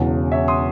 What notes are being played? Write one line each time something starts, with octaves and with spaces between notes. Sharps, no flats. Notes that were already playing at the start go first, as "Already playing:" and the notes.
Already playing: E1 E2 C#3 E3
C#5 E5
C6 D#6